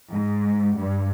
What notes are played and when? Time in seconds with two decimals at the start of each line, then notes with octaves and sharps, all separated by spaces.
0.11 G#2
0.78 G2